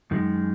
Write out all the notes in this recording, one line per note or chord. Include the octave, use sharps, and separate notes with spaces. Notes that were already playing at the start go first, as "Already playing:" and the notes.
F#2 D#3 G#3